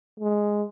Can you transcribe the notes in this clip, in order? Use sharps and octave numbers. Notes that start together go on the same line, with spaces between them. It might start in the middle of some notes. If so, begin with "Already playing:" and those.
G#3